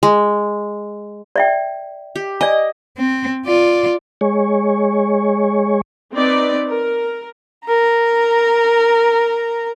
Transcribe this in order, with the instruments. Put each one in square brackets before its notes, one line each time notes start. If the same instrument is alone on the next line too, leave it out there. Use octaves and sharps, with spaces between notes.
[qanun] G#3
[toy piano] D5 E5 G5
[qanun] G4
[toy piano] D5 G#5 [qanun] D#5
[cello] C4
F4 D5
[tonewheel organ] G#3 C#5
[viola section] C4 D#4 B4 D5
A#4
[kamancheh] A#4 A#5